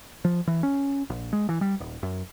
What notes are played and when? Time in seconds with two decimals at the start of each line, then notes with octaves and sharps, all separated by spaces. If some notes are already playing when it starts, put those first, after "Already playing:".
0.25 F3
0.47 E3
0.63 C#4
1.10 A#1
1.33 G#3
1.49 E3
1.61 G3
1.80 D#1
2.03 F#2